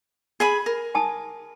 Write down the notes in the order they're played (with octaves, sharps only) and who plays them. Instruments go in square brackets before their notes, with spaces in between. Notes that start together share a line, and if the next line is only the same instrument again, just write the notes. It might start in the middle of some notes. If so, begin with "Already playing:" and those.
[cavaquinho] G#4 G#5 B5
A#4
[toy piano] G#5 A5 D#6